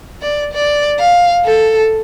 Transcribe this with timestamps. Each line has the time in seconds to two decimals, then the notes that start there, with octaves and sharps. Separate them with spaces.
0.22 D5
0.53 D5
0.99 F5
1.45 A4